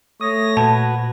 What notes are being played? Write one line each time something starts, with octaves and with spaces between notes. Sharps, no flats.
A3 C#5 D#6 A#6
A#2 F#4 B4 A5 G#6